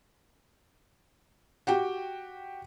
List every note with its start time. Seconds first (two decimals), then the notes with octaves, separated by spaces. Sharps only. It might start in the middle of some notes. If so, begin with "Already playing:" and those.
1.67 F#4 G4 G5